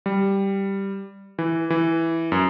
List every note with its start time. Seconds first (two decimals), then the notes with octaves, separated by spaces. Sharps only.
0.06 G3
1.39 E3
1.70 E3
2.32 F#2